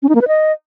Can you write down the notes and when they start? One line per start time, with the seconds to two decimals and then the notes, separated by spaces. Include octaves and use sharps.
0.03 C#4
0.09 D#4
0.15 A#3
0.21 B4
0.28 D#5